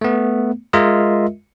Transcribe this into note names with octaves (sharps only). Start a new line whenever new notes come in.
A3 B3
G#3 F4 A#4 D#5 E5